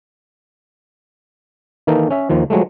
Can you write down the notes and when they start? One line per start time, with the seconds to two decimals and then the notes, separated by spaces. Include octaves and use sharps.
1.87 D#3 E3 A#3 D#4 A4
2.10 C#4 E5
2.30 D#2 D#3 F3
2.50 F3 F#3 G#3 A3